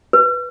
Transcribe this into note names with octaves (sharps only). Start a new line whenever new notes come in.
B4